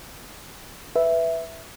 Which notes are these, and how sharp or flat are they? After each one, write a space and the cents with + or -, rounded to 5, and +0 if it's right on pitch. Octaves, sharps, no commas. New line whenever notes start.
B4 +5 E5 +0